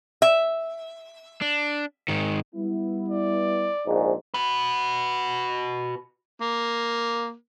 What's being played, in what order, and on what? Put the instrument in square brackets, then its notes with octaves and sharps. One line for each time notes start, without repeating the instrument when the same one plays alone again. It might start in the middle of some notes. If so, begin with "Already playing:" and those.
[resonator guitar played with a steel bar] E5
[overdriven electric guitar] D4
G#2 D#3
[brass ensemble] G3 B3 E4
[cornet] D5
[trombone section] A#1 G#2
[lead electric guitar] F#4 B4
[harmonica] A#3